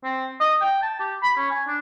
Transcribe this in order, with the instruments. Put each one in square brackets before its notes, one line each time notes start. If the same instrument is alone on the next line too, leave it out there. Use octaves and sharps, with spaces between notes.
[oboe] C4
D#5
G5
A5
G4
B5
C#4
G#5
D4